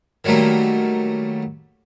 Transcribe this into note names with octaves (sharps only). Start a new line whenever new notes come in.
D#3 F#3 G3 A3 A#3